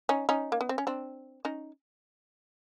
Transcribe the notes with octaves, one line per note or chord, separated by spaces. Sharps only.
C#4 D#4
C#4 D#4
A#3
B3
C4
C#4
C4 D4
C#4 D#4